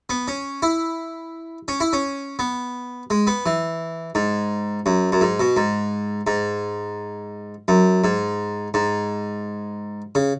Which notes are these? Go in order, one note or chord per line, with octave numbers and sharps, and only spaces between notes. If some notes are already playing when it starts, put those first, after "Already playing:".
B3
C#4
E4
C#4
E4
C#4
B3
G#3
B3
E3
G#2
F#2
F#2
G#2
B2
G#2
G#2
F#2
G#2
G#2
C#3